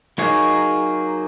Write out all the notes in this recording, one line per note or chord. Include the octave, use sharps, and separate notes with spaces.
F#3 A#3 D#4 G#4 C#5